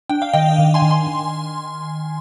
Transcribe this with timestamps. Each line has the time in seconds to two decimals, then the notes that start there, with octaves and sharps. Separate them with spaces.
0.09 D4 G5
0.22 F5
0.33 D#3 D#5 G5
0.58 D#3
0.74 G#5 C6
0.82 D#3
0.90 G#5 C6
1.07 D#3